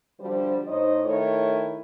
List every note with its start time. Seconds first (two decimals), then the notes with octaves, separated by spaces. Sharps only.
0.20 D3 F3 G3 D4 F#4 C5
0.67 A2 D#4 C5 C#5 D#5
1.05 D#3 A3 E4 A4 C#5